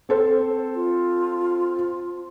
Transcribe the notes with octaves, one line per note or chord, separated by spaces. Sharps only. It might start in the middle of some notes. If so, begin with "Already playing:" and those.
C4 A4 C5
F4